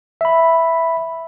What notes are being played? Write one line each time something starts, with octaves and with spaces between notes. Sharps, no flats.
E5 B5